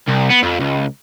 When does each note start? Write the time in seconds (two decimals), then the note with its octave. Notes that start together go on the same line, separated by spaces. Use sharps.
0.08 C2
0.30 B3
0.43 F2
0.61 C#2